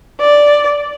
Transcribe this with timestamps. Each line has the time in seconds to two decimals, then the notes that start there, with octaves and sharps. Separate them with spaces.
0.21 D5